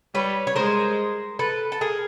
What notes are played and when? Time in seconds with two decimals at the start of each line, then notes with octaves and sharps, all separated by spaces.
0.14 G3 B4 C#5
0.47 C#5
0.56 G#3 A#4 C5
1.39 A4 B4
1.72 A4
1.81 G#4 A#4